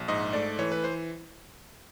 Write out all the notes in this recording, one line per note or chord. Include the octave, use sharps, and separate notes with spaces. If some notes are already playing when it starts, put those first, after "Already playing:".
Already playing: A#1
G#2 D#5
A3 D5
E3 C#5
B4
C5